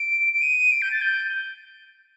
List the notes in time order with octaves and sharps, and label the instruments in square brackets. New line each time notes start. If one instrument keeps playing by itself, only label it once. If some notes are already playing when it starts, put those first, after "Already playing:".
Already playing: [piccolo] D7
D7
D#7
D7
G6
A6
G6